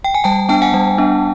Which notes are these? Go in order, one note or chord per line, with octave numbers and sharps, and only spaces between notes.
G5
G#5
G3 G5 A5
B3 D4 G5 A5
F#5 G#5
G3
B3 D4